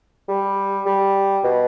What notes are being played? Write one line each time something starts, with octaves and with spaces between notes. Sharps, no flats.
G3
G3
B2